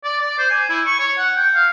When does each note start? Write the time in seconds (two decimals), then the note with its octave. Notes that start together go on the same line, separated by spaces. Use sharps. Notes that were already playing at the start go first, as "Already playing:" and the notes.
0.04 D5
0.21 D5
0.38 C5
0.50 G#5
0.69 E4
0.86 C#6
0.99 C#5
1.18 F#5
1.36 G5
1.54 F5